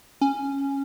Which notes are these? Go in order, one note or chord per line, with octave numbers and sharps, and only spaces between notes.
C#4